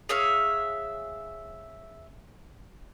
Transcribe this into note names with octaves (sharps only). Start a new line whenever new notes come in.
G#4 C#5 E5 F5